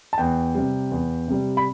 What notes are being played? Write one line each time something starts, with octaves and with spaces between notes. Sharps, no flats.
A5
E2 G5
C3 G3
E2
C3 G3
B5